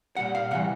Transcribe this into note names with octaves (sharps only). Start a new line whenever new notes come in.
A#2 G3 F#5
F5
C3 E3 G3 F#5